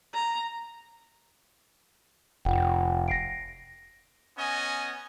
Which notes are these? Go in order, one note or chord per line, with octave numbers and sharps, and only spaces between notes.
A#5
F1 F4 F#5 G5
A#6 C7 D7
B3 C#4 D#5 G#5